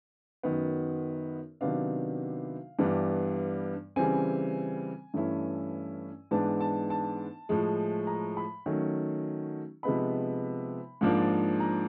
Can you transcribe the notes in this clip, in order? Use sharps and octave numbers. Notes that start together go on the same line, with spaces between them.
F#2 D#3 F#3 B3
C3 D#3 F#3 B3 D4 F5
G2 E3 G3 B3 D4
C#3 E3 G3 C4 G#5
G2 E3 A3 C#4 E4
G#2 E3 G#3 B3 D4 A5
A5
A5
A2 F3 G#3
A#5
B5
D#3 F#3 A3 C#4
C3 F3 G#3 B3 D#4 B5
G#2 F3 A#3 D4
A#5